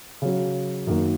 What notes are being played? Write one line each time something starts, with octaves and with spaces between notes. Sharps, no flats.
C#3 F#3 C#4
F#2 D#3 A#3